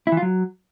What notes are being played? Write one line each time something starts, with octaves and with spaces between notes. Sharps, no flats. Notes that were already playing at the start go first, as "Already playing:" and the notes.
E4
E3
F4
F#3